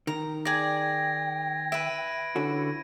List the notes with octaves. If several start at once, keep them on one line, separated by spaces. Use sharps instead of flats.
D#3 A#5
G#4 D5 G5 G#6 A#6
B4 E5 D7 D#7
D3 C#4 E4 F#4